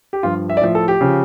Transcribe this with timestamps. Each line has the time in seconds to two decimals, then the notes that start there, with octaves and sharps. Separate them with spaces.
0.13 G4
0.23 G2 F3 F4
0.49 E5
0.57 D5
0.61 A2 F3 E5
0.75 A4
0.88 G4
1.01 C#3 F3